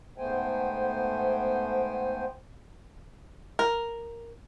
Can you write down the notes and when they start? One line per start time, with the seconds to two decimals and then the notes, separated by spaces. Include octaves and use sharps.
0.18 G#2 A3 B3 C5 G5 G#5
3.59 A#4